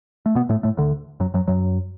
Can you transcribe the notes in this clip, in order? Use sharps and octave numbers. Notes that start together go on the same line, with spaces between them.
A3
B2 B3
A2 A3
A2 A3
D2 D3
F#2 F#3
F#2 F#3
F#2 F#3